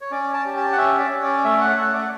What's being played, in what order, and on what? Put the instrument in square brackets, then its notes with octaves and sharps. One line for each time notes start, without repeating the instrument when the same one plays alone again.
[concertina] C#5
C#4 D5
A5
G4
A5
F#5
C#4 E5
D5
C#4
D5
A3 E5
F#5
A3 F#5
D5